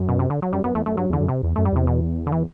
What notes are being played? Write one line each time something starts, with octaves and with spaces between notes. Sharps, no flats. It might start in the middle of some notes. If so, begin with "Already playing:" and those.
Already playing: F#2
B2
C3
D3
F#3
F#2 G3
F#2 B3
E2 A3
F#2 A3
G2 F#3
E2
D3
F#2
C3
E2
F#2 A3
G3
E2 C3
B2
D3
E3